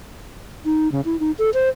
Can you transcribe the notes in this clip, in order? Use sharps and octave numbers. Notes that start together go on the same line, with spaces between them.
D#4
C#3
E4
D#4
A4
C5